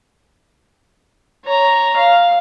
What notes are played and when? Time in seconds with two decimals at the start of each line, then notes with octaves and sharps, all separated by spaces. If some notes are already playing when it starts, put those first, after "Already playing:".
1.45 C#5 A#5
1.97 F5